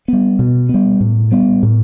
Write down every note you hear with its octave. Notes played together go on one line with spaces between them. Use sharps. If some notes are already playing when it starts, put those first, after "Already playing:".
G3 B3
B2
G3 B3
A2
G3 B3
A2